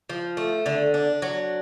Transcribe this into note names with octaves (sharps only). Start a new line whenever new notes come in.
F3
A3
D3
D4
F#3